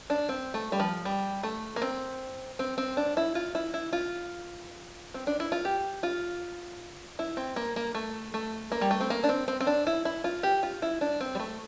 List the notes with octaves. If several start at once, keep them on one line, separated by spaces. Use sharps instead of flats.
D4
C4
A3
G3
F3
G3
A3
A#3
C4
C4
C4
D4
E4
F4
E4
E4
F4
C4
D4
E4
F4
G4
F4
E4
C4
A#3
A#3
A3
A3
A#3
G3
A3
C4
A#3
D4
C4
C4
C4
D4
E4
E4
F4
G4
F4
E4
D4
C4
G3
A3